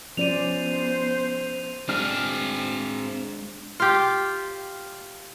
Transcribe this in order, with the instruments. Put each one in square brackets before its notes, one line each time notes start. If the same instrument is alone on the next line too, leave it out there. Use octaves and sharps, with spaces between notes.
[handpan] F3 C#4 D5 [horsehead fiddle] B3 C5 [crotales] D#7 F7
[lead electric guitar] G#3 D4 [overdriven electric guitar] C4 G#4 [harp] F6
[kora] F4 G4